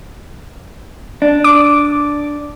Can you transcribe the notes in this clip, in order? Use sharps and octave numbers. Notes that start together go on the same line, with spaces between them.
D4
D6